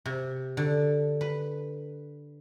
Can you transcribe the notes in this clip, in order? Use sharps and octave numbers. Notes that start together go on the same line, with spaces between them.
C3
D3
B4